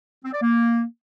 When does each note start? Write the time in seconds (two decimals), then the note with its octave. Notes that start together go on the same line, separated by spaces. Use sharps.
0.24 C4
0.33 D5
0.41 A#3